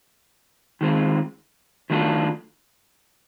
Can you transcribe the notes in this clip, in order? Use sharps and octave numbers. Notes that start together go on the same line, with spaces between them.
D#3 G#3 C4 F4
D#3 F#3 A3 D4 F4